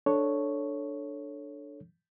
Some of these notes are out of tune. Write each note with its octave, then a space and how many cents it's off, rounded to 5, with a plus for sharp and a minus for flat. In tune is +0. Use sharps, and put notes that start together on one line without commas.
D4 +5 A4 +0 C#5 +0